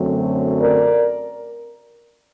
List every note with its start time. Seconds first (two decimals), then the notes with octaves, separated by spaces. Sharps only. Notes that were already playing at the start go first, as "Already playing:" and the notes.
Already playing: F#2 D3 F#3 A3 C4
0.60 A#4 D5